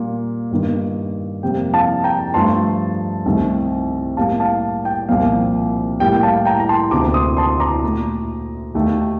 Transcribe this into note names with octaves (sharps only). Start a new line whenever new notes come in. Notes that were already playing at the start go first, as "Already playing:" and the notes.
Already playing: A#2 G3 A#3
G2 D#3 A#3
F2 C3 G3 A#3 G5
F5 A5
G5 A#5
G2 F3 A3 A5 C6
C2 C3 D#3 A3
A2 G3 A#3 F5 A5
F5 A5
G5
C2 A#2 F3 A#3 F5
A2 G3 A#3 G5
G5
F5 A5
G5 A#5
A#5
A5 C6
D2 C3 D#3 A#3 A#5 D6
C6 D#6
A5 C6
A#5 D6
A#2 A3
D#2 D#3 A3